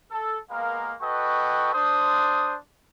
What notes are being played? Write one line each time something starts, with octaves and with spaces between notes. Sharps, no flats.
A4
G#3 A#3 B3 A#4 F5
F#4 A4 B4 D#5 G5 C#6
D4 C5 D#6